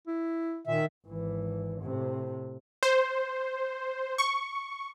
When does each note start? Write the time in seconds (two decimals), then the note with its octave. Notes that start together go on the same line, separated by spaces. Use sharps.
0.07 E4
0.67 A#2 D#3 E5
1.07 G#1 E3
1.82 A2 C3
2.83 C5
4.18 C#6